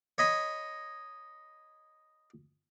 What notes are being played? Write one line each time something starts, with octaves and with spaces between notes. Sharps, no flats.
C#5 D#5 B5